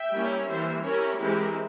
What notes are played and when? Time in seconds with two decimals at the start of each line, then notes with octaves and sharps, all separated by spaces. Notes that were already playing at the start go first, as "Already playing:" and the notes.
Already playing: E5 G5
0.12 G3 A#3 C#4 E4
0.47 E3 G3 A#3 C5 E5
0.82 G3 C#4 E4 A#4 C#5
1.18 E3 G#3 C4 E4 G4 A#4